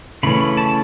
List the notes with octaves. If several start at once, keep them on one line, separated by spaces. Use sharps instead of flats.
C#3 E3 A3 C#4 B5
B5
A5